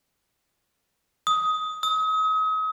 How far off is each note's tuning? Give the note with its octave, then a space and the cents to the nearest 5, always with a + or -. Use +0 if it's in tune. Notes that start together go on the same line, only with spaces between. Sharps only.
D#6 +15
D#6 +40